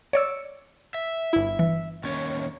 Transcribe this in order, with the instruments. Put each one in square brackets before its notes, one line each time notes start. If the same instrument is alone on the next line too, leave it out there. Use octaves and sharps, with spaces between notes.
[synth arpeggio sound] C#5 D5 E6
[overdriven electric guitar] E5
[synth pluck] G1 E4
[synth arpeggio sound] E3
[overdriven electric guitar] D#2 C#4